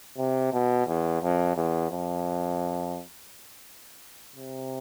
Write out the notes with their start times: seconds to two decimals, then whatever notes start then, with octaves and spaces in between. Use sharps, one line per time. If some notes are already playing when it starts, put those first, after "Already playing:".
0.18 C3
0.53 B2
0.87 E2
1.23 F2
1.57 E2
1.91 F2
4.36 C3